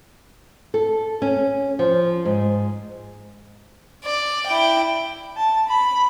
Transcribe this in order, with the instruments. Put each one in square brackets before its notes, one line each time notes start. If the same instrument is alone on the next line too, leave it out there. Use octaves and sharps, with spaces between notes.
[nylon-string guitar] A4
C#4
F3
G#2
[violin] D5
E4 G5
[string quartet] A5
B5